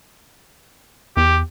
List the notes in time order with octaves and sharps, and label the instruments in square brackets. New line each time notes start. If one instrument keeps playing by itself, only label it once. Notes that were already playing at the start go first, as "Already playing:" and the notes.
[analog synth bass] E2 [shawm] G4